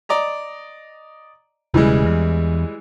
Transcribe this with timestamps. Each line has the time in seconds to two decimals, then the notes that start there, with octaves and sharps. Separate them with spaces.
0.09 D5 D#5 A#5
1.74 E1 C#3 E3 G3 G#3
2.05 E2